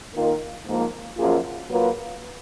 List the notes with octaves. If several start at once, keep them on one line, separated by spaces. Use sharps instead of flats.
D#3 A#3 F4 A#4 D#5
G#2 F3 A#3
F#2 F3 A#3 F4 G#4
F#3 A#3 F4 B4